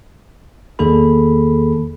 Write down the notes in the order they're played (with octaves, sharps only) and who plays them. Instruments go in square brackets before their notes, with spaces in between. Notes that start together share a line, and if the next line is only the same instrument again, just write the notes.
[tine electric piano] E2 D#3 A#3 G#4 A4 B5